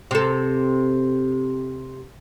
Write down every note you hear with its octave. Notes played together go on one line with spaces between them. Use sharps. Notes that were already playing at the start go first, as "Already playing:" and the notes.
C3 A4